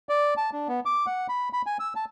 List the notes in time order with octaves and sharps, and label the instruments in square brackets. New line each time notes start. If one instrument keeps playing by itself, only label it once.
[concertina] D5
A5
D4
B3
D6
F#5
B5
B5
G#5
E6
A5